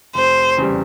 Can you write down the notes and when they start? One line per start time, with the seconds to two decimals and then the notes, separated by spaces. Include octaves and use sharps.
0.14 F1 C5
0.57 E2 C#3 E3 G3